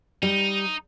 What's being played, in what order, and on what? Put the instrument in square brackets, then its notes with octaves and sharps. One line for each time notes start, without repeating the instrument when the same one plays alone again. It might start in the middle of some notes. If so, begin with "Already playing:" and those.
[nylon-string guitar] G3 [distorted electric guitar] D#4